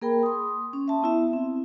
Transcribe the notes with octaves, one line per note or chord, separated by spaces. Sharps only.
A#3 G#4 A#4 G5 B5
C6 D#6
C#4
E5 A5 C6
B3 E4 E5
C4